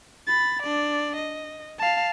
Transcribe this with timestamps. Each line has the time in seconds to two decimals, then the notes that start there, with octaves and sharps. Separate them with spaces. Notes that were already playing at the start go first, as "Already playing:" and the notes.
0.27 B5 A6
0.63 D4 D5
1.16 D#5
1.79 F5 A5